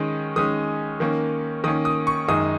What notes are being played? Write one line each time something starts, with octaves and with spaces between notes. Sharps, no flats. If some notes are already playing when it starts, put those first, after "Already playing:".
Already playing: D#3 G#3 C#4 D#6
D#3 G#3 C#4 D#6
D#3 A#3 C#4
D#3 A#3 C#4 D#6
D#6
C#6
F#2 D#3 G#3 D#4 D#6